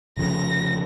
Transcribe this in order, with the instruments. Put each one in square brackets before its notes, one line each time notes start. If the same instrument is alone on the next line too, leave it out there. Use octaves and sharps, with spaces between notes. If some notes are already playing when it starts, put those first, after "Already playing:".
[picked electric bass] F1 F2 C#3 [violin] A#6